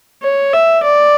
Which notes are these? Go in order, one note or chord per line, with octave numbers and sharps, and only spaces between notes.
C#5
E5
D5